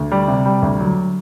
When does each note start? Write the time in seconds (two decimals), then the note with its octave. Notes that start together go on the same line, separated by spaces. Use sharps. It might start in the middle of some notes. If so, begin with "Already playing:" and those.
Already playing: D2
0.12 G3
0.28 C3
0.46 G3
0.62 D2
0.80 F#3